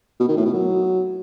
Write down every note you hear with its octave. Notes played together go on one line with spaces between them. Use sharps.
B2
D#3
A2
B2
F#3